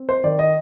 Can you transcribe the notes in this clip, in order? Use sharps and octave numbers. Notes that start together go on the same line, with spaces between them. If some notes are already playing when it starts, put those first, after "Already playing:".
Already playing: C4
C5
D#3 D5
D#5